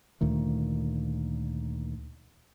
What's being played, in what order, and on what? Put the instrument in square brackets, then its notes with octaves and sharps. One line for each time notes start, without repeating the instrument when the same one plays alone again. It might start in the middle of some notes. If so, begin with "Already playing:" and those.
[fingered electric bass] D2 A#2 D#3 A3